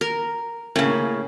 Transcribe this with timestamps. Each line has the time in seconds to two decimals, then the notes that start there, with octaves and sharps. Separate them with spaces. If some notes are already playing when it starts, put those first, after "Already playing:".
0.01 A#4
0.76 A2 C#3 A#3 C#4